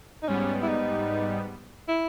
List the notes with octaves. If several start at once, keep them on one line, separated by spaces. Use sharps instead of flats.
D#4
G#2 G3 B3 C#4
E4
D#4
E4